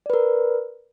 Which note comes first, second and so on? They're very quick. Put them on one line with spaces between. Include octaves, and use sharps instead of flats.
D5 B4 A#4